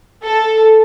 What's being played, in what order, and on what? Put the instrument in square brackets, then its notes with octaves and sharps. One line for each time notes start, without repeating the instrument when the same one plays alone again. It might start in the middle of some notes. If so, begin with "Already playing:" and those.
[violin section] A4